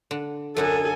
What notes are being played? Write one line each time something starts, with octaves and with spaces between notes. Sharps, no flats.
D3
F#2 D3 D#4 A4 G#5